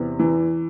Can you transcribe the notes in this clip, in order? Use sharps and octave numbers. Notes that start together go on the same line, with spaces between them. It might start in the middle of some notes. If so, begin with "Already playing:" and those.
Already playing: E2 C3
E3